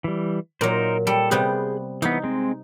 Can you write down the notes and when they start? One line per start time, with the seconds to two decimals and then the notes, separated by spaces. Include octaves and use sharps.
0.04 E3 G3
0.61 A#2 F#3 D#4 A#4 C5
1.07 G3 A4
1.31 C3 G3 B3 G#4 F#6 G6
2.02 E3 B3 D#4
2.24 G#3 C4